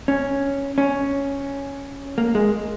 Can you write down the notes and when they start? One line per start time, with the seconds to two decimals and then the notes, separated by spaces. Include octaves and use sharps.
0.08 C#4
0.78 C#4
2.18 A#3
2.35 G#3